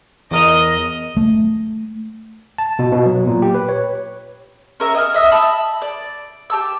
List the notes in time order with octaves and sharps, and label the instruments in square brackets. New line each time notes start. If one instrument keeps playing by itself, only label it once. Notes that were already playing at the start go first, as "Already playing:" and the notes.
[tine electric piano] E2 A#4 A#5 [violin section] D#5
[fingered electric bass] A3
[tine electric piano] A5
B2
B2
F#3
A#2
G4
B4
C#5
[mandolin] C#4 A#4 E5
D#5 G#5 D#6 F6
D#5 E5 D#6
A5 B5 D#6 E6
D5
G4 A5 E6